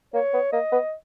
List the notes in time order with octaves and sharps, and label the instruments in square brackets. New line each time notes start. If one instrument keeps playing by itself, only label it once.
[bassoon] A#3 [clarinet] C#5
[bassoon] B3
[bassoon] A#3 [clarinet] D#5
[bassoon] B3